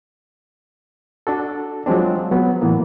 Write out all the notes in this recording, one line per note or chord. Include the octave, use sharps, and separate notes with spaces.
D4 F#4 A4
F3 F#3 G#3 C4 D4
F#3 B3
A2 E3 A#3 B3